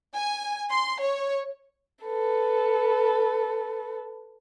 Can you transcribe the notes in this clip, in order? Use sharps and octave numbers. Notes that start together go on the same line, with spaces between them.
G#5
C6
C#5
A4 B4